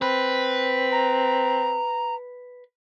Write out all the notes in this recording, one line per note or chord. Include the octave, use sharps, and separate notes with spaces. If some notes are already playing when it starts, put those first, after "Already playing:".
C4 B4
A#5